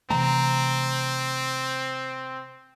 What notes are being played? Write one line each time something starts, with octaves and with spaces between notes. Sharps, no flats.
C3 E3 A3 C4 A#5